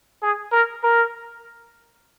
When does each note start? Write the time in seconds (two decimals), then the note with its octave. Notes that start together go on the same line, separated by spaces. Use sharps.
0.22 G#4
0.52 A#4
0.83 A#4